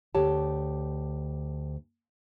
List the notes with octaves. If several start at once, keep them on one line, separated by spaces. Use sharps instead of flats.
D2 G4 C#5 A5